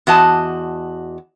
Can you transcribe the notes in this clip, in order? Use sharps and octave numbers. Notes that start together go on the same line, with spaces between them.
E2 F#4 D#5 A5